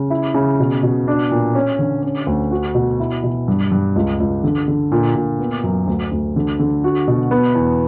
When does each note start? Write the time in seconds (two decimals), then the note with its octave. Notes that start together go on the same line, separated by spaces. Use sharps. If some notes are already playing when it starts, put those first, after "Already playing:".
Already playing: C#3
0.10 E4
0.34 C#3
0.60 B2
0.83 B2
1.08 D4
1.31 A#2
1.55 C#4
1.79 D3
2.03 C#4
2.27 D2
2.51 F#4
2.75 B2
3.00 E4
3.24 B2
3.48 G2
3.72 G2
3.96 C#2
4.20 C#2
4.44 D3
4.68 D3
4.92 A#2
5.15 A#2
5.39 B3
5.63 F#2
5.87 D2
6.12 D2
6.36 D3
6.59 D3
6.84 F#4
7.08 B2
7.31 B3
7.55 E2